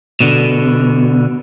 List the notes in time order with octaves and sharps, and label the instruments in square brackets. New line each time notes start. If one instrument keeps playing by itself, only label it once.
[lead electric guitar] B2 D3